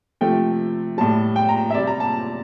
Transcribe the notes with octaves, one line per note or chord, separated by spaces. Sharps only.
C3 F3 A3 G5
A2 G3 A5
G5
A#5
E5
C3 G3 D5
A#5
A5